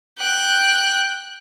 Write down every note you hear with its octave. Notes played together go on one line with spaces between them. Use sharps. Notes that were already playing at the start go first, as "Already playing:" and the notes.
G5 F#6